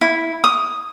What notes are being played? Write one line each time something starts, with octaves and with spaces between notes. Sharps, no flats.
E4
D#6